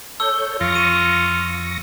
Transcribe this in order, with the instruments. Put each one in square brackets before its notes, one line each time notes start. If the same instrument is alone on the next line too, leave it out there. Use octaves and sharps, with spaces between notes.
[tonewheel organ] A4 C#5 G6 [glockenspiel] E6
[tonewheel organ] F2 C#6 A#6 [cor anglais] F4
[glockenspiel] D#7